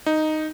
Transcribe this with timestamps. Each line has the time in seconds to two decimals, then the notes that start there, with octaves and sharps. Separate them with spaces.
0.06 D#4